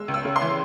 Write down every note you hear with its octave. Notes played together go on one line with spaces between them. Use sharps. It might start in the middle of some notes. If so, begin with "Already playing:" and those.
Already playing: G#3 E6
C#2
E6
C#3
C6
E3